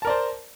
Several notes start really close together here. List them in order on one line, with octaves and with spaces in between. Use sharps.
A5 A#4 D5 C5